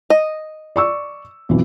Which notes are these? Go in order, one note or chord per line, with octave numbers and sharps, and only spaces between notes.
D#5
D5 C#6 E6
B1 F2 E3